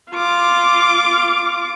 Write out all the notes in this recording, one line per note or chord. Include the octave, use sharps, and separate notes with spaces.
F4 D6